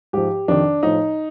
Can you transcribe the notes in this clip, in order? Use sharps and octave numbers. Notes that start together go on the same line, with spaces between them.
G#2 F3 G4
F2 C3 D#3 D4
A2 F3 D#4